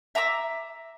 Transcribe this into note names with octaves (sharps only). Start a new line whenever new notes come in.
E5 A#5 D6 E6